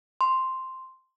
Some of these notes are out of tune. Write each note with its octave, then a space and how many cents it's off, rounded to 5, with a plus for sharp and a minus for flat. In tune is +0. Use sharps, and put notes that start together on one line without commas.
C6 +0